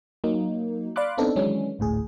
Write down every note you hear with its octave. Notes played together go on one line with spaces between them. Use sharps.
F#3 A#3 D#4
D5 F5 B5 C6 D6 F#6
B3 C4 D4 D#4 A4
D#3 E3 F#3 G#3 C#4 D4
G#1 D2 A2 G#4